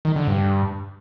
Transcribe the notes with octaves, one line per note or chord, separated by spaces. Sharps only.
D#3
D3
G2